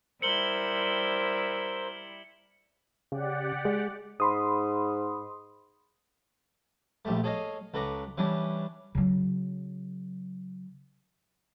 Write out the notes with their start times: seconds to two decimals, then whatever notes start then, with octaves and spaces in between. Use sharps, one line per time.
0.22 G3 E4 A#4 C5 E6 C#7 F#7 G7
3.12 C#3 G4 D5 F#5
3.65 G#3
4.20 G#2 B5 C6 D#6
7.05 A#1 G3 A3
7.24 G#4 A4 C#5 D#5 F5 G#5
7.74 C#2 A4 B4 A#5 C#6 D6
8.18 E3 G3 C#4 D4
8.95 C#3 F#3